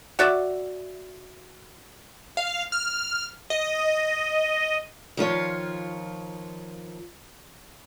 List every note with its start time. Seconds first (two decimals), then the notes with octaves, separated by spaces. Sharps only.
0.19 F#4 D5 E5
2.37 F5
2.72 F6
3.50 D#5
5.17 D#3 F3 F4 C#5